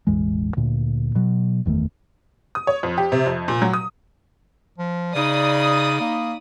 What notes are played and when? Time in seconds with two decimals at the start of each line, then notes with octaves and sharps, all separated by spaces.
0.07 E1 A1 E2 G#3
0.57 D2 A#2
1.15 B2 F#3
1.66 F#1 E2 D#3 A3
2.55 D#6
2.67 C#5
2.83 F2
2.98 G4
3.12 C3
3.26 F2
3.48 A#2
3.62 F#3
3.74 D#6
4.78 F3
5.15 C#3 D#4 D5 B5 D#6
6.00 A#3